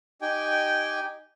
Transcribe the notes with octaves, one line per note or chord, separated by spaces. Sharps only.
D#4 G4 G5 G#5